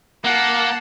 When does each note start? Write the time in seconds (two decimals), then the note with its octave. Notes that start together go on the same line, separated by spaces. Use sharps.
0.24 A#3 F#5 A5